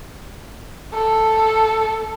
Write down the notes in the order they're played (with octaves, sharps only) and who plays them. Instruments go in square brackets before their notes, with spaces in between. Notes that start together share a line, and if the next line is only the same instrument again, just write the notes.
[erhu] A4